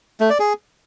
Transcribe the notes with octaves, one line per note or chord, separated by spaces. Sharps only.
A3
D5
G#4